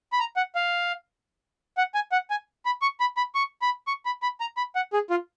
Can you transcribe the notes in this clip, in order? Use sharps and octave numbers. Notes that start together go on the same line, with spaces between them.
B5
A#5
F#5
F5
F#5
G#5
F#5
G#5
B5
C#6
B5
B5
C#6
B5
C#6
B5
B5
A#5
B5
F#5
G#4
F4